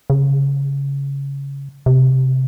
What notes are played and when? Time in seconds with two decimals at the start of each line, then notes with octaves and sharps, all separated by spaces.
0.10 C#3
1.86 C3